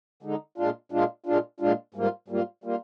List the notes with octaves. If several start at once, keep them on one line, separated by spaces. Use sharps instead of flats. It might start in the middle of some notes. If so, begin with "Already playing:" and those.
D3 G#3 D#4
A#2 G#3 D4 F4
A#2 G#3 D4 F4
A#2 G#3 D4 F4
A#2 G#3 D4 F4
G#2 G3 A#3 F4
G#2 G3 A#3 F4
G3 A#3 F4